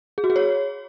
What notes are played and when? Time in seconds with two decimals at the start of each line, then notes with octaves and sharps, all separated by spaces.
0.18 G#4
0.24 F#4
0.30 G#4
0.36 C#5